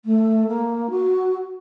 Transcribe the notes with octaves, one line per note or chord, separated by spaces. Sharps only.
A3
A#3
F#4